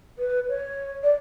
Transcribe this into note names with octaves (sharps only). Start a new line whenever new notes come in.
B4
C#5
D5